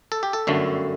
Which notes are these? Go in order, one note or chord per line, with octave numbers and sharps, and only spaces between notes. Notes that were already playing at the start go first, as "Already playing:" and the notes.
A4
G4
A4
G1 F#2 D3 A3